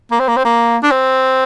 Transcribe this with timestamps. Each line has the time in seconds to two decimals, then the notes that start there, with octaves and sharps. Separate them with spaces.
0.12 A#3
0.20 C4
0.28 A#3
0.37 C4
0.45 A#3
0.83 D4
0.91 C4